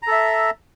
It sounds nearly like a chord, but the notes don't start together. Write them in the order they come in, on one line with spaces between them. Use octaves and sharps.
A#5 A4 E5